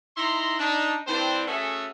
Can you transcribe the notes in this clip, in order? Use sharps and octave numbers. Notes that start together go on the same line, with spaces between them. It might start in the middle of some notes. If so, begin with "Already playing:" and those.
D#4 E4 A#5 C6
D4 D#4
G2 E3 C4 D4 G4 C5
A3 C#4 F#4 G#4 A4 E5